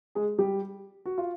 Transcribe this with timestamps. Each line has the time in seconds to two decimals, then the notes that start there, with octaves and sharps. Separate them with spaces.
0.15 G#3 G#4
0.38 G3 G4
1.06 F#4
1.18 F4